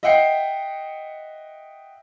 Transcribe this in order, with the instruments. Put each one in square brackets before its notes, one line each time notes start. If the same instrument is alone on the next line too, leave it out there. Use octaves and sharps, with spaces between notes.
[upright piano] D#5 E5 F#5 G5 C7 C#7